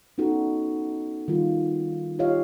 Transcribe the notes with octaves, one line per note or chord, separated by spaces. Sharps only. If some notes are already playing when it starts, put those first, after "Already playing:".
B3 C#4 D#4 F#4 A4
D#3 G3 F4
F4 G4 C#5 D#5 F5